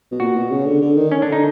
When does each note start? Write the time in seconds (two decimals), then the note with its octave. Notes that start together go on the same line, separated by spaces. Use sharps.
0.11 B2
0.20 A#2 F#4
0.36 B2
0.51 C#3
0.66 D3
0.82 D3
0.97 D#3
1.12 C#4
1.22 D4
1.28 D3 D#4